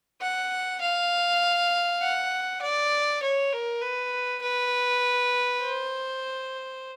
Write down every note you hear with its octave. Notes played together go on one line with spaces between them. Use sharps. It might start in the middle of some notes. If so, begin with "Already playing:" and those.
F#5
F5
F#5
D5
C#5
A#4
B4
B4
C5